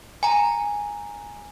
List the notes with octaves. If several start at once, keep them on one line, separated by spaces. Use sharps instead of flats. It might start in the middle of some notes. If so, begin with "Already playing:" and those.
G#5 A#5